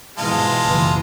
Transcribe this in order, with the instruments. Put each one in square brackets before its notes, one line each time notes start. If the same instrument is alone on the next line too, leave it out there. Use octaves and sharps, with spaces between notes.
[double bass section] G#2 B2 E3 [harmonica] G#3 F4 [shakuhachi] A5
[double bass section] F#1 E3